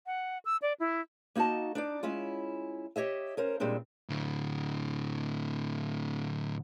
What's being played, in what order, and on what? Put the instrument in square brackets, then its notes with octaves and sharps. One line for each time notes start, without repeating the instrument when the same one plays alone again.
[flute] F#5
E6
D5
E4
[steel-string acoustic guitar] A#3 D#4 F#4 D#5 A5
D4 D#4 D5
G#3 C#4 E4 F4
G4 C#5 D#5 E5
C#4 A#4 C5
A#2 G3 G#3 C4 D4
[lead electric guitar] A2 D3